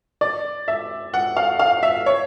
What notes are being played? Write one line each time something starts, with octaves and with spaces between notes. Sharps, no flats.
D5
E5
F#5
F5
F5
E5
C#5